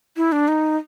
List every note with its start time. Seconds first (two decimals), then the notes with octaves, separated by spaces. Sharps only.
0.17 E4
0.32 D4
0.48 D#4